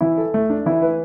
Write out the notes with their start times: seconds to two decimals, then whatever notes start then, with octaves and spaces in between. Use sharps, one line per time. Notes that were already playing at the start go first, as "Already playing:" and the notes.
0.01 E3 E4
0.18 A4
0.34 A3
0.50 D4
0.66 E3 E4
0.82 B4